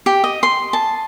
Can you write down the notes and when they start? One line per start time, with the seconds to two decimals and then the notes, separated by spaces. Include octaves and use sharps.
0.06 G4
0.24 D#5
0.43 C6
0.73 A5